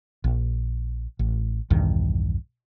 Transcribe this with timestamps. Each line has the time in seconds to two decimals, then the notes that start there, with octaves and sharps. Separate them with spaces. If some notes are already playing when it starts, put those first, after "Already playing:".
0.24 A#1
1.19 A1
1.70 B1 E2 G2 D#3